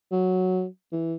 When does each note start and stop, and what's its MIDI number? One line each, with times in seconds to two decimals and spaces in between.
0.12 0.66 54
0.92 1.15 52